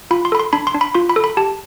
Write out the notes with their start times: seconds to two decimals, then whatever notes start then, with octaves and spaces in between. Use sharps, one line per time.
0.11 F4 B5
0.25 C6
0.32 A4 B5
0.39 C6
0.53 D4 B5
0.67 C6
0.74 D4
0.81 B5
0.94 F4 C6
1.09 B5
1.16 A4
1.24 B5
1.37 G4 A5